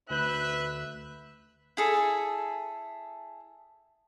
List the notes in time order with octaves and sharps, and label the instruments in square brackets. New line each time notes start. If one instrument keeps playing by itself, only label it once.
[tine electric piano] D2 G6 [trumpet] B4 [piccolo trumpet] E5 [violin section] F#6
[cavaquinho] E4 G#4 A4